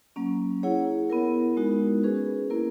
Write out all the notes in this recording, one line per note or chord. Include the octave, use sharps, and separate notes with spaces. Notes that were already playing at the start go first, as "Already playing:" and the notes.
F#3 A#3 C#4
E4 G#4 C#5 F#5
B3 E4 A#4
G#3 B3 D#4 F#4 A#4
C#4 G#4 B4
A#3 E4 A#4